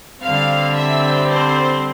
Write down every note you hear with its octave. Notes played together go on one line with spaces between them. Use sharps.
D3 G3 C4 F5
E5
C5